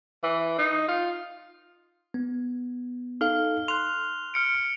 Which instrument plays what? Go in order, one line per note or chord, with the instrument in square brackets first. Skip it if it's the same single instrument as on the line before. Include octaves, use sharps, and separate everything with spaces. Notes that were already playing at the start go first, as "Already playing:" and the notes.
[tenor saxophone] E3
D#4
F4
[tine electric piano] B3
[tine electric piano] D#4 A4 F5 [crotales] F6
[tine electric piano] C6 F#6 [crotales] F7
[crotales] F6 C#7 D7